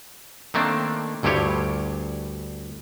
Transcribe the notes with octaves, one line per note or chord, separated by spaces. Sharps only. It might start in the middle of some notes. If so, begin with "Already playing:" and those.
D#3 A3 A#3 C4 D4
D2 G2 E4 F4 G4 C#5